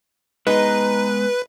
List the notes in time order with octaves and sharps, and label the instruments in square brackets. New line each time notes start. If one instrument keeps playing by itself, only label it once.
[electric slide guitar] G#3 B3 G#4 [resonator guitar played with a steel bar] D#4 [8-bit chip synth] B4